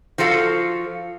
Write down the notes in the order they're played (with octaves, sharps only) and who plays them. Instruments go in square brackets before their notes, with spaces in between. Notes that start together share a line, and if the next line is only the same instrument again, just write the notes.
[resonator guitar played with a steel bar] F3 F4 F#4 A4 F5